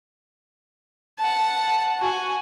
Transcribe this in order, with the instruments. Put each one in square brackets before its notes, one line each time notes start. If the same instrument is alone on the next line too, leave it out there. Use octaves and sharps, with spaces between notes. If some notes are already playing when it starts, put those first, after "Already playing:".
[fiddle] F#5 A5
F#4 G#5